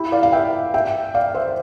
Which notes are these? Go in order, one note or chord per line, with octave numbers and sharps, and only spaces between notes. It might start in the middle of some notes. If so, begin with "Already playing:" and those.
Already playing: E4 G4
D5 F5
F5
E5 G5
E5 G5
D5 F5
C5 E5